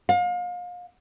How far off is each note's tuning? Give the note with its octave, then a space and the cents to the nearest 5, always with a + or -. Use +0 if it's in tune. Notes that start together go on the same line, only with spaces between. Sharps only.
F5 +35